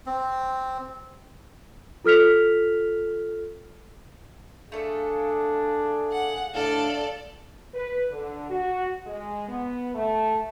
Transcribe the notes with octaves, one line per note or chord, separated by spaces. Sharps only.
C4
F4 A4 F6 B6 F7
A3 D4 G#4 A4 F5
F#5
A2 D4 A4 D5 F5
B4
D3
F#4
G#3
B3
A3